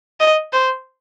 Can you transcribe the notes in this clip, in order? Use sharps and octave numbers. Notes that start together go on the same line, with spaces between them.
D#5
C5